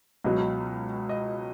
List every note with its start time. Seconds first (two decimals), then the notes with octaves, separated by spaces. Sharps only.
0.24 C#2 B2 F#3 D#5
1.09 D#5